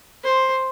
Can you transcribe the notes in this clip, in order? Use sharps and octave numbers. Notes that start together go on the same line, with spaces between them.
C5